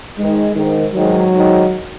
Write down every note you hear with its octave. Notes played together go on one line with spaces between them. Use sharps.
G#2 D#3 G#3
G#2 D#3
G#2 D#3 F#3
G#2 D#3